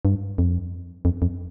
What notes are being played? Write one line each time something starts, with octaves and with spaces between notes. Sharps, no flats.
G2
F2
F2
F2